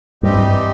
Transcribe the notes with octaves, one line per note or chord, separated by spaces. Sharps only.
G2 E3 G3 C4 D#4 G4
G2